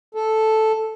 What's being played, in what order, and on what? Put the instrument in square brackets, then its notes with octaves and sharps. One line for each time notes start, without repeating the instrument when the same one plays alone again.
[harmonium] A4